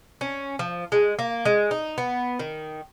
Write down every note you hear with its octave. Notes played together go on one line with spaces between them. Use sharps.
C#4
F3
G#3
A#3
G#3
D#4
B3
D#3